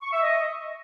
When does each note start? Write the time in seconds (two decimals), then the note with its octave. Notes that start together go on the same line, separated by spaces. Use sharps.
0.02 C#6
0.13 E5
0.23 D#5